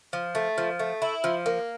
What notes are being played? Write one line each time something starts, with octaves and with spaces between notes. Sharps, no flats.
F3
A3
F3
A3
E4
F3
A#3